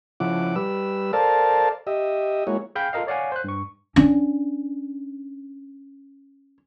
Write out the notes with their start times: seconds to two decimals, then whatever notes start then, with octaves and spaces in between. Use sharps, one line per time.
0.20 C#3 F3 E4 F#5 D6
0.56 G3 B4 E6
1.13 A4 A#4 C5 D5 F5 A5
1.87 G4 D#5 E5
2.47 G#3 A#3 E4 F#4 C#5
2.75 G#4 F5 G5 B5 F6 G6
2.93 F4 A4 A#4 D#5 F5
3.07 C#5 D5 F5 F#5 G#5
3.32 C5 F#6
3.44 G2 C#6
3.96 C#4 D4